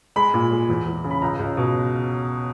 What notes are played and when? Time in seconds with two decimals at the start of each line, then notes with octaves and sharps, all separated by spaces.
0.16 G#3 B5
0.34 A#2
0.51 G#3
0.69 E2
0.86 E2
1.04 C#3
1.10 B5
1.22 C#2 A#5
1.39 C#2
1.57 B2